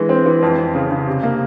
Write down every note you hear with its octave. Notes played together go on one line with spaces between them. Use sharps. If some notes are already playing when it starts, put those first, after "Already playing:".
Already playing: E3 G#3
C4
E3
F2
F2
C#3
C#3
C3
A#3